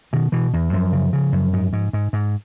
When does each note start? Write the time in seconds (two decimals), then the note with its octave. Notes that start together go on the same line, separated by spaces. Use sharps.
0.13 B2 D#3
0.32 B2 E3
0.53 E2
0.73 F#2 F3
0.93 C#3
1.13 C#3
1.32 F#2
1.53 G#2
1.73 G#2
1.93 G#2
2.13 G#2